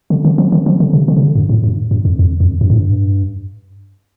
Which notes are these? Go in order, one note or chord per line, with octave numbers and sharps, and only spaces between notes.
D3
D#3
F3
D#3
F3
D3
C3
D3
C3
D3
G2
A2
G2
G2
F2
F2
F2
G2
A2
G2